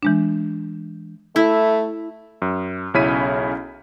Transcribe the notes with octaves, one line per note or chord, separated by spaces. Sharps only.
E3 G#3 D4
A3 E4
F#2
B1 C#3 C#4 E4 B6 D#7